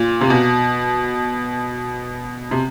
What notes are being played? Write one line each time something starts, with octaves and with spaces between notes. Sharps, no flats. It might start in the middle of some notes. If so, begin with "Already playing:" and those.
Already playing: A#2
C3
B2
C3